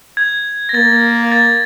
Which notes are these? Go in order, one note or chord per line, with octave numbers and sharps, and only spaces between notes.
G#6
A#6
A#3 A6
A6